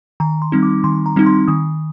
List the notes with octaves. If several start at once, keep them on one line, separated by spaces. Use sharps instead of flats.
D#3 A#5
C6
G3 C4 D#4
D6
D#3 C6
A#5
G3 C4 D#4
C6
D#3 D#6